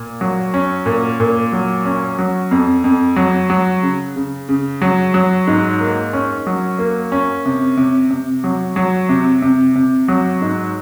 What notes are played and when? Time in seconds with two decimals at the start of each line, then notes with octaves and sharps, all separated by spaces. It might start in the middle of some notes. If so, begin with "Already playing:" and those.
Already playing: A#2
0.21 F#3
0.54 C#4
0.86 A#2
1.20 A#2
1.52 F#3
1.85 C#4
2.19 F#3
2.51 F2
2.84 F2
3.16 F#3
3.50 F#3
3.82 C#3
4.16 C#3
4.49 C#3
4.82 F#3
5.14 F#3
5.47 G#2
5.80 A#3
6.13 C#4
6.47 F#3
6.79 A#3
7.12 C#4
7.45 C3
7.77 C3
8.10 C3
8.44 F#3
8.76 F#3
9.09 C3
9.42 C3
9.75 C3
10.08 F#3
10.41 G#2